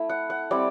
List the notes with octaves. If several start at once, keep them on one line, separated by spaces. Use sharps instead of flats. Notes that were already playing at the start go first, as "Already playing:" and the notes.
Already playing: A3 E4
F#5
F#5
G3 C4 E4 D5